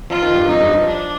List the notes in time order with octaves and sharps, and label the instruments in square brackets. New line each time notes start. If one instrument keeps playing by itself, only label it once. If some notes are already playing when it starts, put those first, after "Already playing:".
[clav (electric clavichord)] F3 [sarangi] F4
[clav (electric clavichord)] D#3
G2
[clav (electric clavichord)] F2 [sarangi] D#4
[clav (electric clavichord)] G2
F3
[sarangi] D4